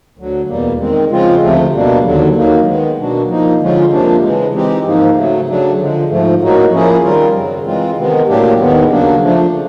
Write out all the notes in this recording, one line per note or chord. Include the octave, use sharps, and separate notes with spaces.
D2 D3 F#3
E2 B2 G3 A#3
D#3 G#3 C4
C#3 F3 G#3 C4 F4
D2 C3 F3 A3
B2 G3 A#3 D4
D#2 D3 F#3
F#3 A#3 D#4
D#3 G#3 B3
B2 F#3 A#3 D4 F#4
F3 A#3 D#4
D3 F3 G#3 C#4 F4
F2 C3 F3 A#3 D4
C#3 E3 G#3
E3 G#3 C4 D#4 G4
G#2 F3 A#3 D#4
C#3 F#3 A3
C#3 F#3 A3 D4
D3 F3 G#3
G#2 F3 A3
A2 F#3 A#3 D#4 F#4
F3 A#3 C#4 E4 G#4
D#3 G3 C4 F4 A#4
F#2 C#3 F#3
E3 G#3 C4 F4
C3 D#3 G#3 B3
A2 F#3 A#3 D4 G4
D#2 D#3 G#3 B3
C#3 F#3 A#3 D4
F3 A3 D4
C#3